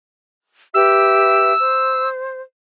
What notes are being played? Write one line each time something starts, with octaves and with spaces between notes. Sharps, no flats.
G4 B4 E5 E6
C5